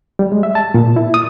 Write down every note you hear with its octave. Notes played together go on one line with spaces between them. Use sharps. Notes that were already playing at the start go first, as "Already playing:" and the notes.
G3
G#3
E5
A5
A#2
E4
D#6